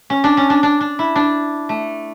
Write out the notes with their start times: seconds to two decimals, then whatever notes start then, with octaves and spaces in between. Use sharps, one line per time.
0.10 C#4
0.24 D4
0.37 C#4
0.50 D4
0.63 D4
0.81 D4
0.99 E4
1.16 D4
1.69 A3